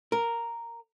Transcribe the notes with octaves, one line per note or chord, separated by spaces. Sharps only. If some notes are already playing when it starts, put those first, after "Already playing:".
A#4